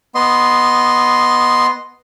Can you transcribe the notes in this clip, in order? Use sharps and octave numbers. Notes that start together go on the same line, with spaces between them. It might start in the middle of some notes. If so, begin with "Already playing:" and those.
B3 D#5 C6